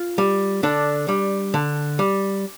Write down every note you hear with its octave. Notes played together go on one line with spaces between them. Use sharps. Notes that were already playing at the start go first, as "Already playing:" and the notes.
Already playing: F4
G3
D3 D4
G3
D3
G3